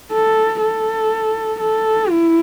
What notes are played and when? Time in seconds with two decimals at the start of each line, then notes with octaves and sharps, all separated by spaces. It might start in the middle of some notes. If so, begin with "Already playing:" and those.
0.12 A4
0.61 A4
1.60 A4
2.10 E4